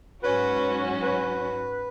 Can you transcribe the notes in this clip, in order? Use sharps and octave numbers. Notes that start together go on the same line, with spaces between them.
G#2 F#3 C#4 F#4 B4
B4